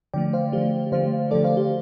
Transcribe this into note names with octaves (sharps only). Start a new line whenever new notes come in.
D3 F3 A3 D5 G5
C5 F5
D3 F3 A3 G4
D3 F3 A3 C5 F5
D3 F3 A3 A4 D5
C5 F5
G4